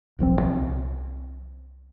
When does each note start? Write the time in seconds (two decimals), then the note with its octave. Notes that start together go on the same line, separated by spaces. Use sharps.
0.19 D1 A#1 F3 C4
0.41 C2